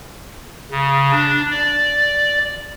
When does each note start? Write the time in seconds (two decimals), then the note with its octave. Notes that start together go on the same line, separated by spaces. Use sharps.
0.71 C#3
1.12 D4
1.51 D5